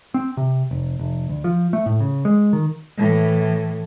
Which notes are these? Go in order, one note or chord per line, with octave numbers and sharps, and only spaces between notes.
C4
C3
F1
F1
D2
F3
A3
A2
C#3
G#3
D#3
A2 E3